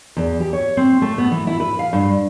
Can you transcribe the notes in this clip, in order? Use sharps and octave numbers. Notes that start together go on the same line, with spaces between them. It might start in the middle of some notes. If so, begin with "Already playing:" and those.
E2
G4
C#5
C4
A3
B3
E3
E4
B4
F5
G2